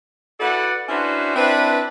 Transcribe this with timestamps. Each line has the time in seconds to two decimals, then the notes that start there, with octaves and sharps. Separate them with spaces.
0.40 E4 F#4 A4 B4 D5 F#5
0.89 C#4 D4 E4 F#4 B4 C5
1.36 C4 D4 E4 B4